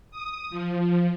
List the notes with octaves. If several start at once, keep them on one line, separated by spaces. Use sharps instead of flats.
D#6
F3